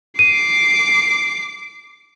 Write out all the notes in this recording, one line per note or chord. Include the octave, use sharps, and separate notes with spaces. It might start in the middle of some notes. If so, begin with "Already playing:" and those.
D6 C7 D#7